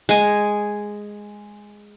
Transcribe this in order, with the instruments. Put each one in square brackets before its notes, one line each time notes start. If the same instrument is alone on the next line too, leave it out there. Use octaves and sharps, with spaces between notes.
[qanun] G#3 G#5